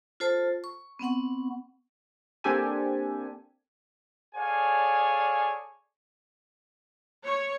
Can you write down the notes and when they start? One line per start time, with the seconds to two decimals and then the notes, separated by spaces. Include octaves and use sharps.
0.20 F4 A4 C5 A5
0.64 C#6
0.99 B3 C4 F#5 C#6
2.44 A#3 C4 D4 G4 A4 G#5
4.36 G#4 A4 C#5 D5 F5 G#5
7.24 C#5